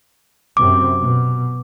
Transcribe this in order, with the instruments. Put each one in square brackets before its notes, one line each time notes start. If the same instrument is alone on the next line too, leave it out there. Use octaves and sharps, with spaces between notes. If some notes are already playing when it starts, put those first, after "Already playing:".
[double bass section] F#2 C3 C4 [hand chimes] D6
[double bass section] B2